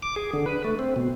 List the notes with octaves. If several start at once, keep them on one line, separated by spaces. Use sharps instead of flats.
D6
G#4
D3
B4
A3
C4
B2